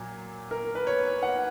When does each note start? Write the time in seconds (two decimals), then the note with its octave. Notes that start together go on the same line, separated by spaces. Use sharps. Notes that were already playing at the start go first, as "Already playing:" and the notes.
Already playing: A#2 F#3
0.51 A#4
0.75 B4
0.87 C#5
1.23 F#5